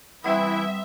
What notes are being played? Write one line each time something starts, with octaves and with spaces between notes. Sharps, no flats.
E3 G3 B3 C4 E4 E5 D#6